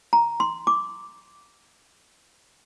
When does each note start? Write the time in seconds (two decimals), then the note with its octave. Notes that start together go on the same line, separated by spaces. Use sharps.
0.13 A#5
0.40 C6
0.67 D6